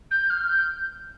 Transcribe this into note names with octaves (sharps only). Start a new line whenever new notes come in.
G6
F6
G6